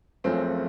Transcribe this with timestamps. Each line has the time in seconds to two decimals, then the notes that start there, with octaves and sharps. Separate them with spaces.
0.24 F#1 F#2 C#3 F3 A3 C4